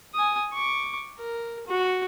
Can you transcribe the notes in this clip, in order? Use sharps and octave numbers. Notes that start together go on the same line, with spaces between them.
G#5 D#6
C#6 D6
A#4
F#4